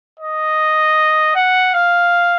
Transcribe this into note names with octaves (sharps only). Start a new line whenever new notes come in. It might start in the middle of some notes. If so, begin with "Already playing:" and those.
D#5
F#5
F5